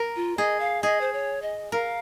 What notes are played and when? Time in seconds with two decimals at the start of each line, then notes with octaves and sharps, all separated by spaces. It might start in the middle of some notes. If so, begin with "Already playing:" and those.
Already playing: A#4
0.16 F4
0.38 G#4 D#5
0.60 F5
0.83 G#4 D#5
1.01 C5
1.13 C#5
1.42 D#5
1.72 A#4 F5